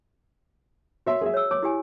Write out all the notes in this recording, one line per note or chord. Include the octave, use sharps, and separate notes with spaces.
F#4 C#5 E5 C6
G#4 E5
C#5 E6
C#5 D6
E4 G4 G#5